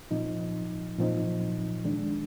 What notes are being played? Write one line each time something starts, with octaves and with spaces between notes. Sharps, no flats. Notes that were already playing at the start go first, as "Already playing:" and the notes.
A#2 F3 C4 D#4
A#2 F3 C4 D#4
D#3 G#3 D4